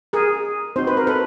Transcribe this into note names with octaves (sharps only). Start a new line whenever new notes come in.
G#4 A#4
C4 D#4 F#4 C5
B4
A#4
A4 B4